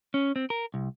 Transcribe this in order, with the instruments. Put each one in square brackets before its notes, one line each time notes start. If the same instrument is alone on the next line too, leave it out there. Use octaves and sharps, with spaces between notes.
[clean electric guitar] C#4
C4
A#4
C2